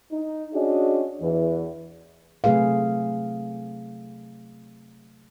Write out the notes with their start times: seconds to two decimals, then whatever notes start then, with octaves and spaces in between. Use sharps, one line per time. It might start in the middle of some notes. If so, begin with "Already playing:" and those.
0.12 D#4
0.53 C#4 D4 F#4 G#4 D#5
1.21 E2 E3
2.44 C3 F#3 A3 G#4 B4 F5